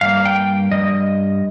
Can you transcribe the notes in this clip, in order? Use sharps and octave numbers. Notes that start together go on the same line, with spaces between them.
G2 G3 A#3 F5
G5
G2 G3 D#5